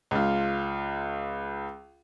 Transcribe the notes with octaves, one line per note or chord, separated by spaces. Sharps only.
C#2 F4